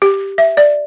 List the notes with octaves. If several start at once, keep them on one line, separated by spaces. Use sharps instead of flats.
G4
E5
D5